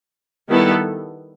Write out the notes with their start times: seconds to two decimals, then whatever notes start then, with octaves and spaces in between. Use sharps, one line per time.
0.49 D#3 G3 B3 E4 A4